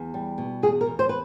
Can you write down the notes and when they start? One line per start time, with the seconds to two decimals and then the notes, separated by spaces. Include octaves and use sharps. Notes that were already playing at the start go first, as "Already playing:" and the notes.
Already playing: E2
0.14 G3
0.38 B2
0.63 E2 G#4
0.81 A#4
0.86 E2
0.99 C5
1.09 B4